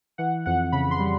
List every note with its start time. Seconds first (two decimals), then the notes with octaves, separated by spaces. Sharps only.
0.18 E3 F#5
0.46 F2 F#5
0.72 C#3 B5
0.91 C6
0.99 G3